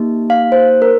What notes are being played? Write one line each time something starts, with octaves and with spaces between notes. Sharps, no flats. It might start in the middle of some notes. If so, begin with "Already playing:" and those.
Already playing: A#3 D#4 G4
F5
C5
A#4